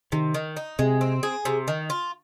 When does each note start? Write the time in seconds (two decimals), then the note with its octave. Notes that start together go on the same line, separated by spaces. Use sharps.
0.12 C3 D#3
0.34 D#3
0.56 D#4
0.79 C3 G#3
1.01 C4
1.23 G#4
1.45 C3
1.68 D#3
1.90 F4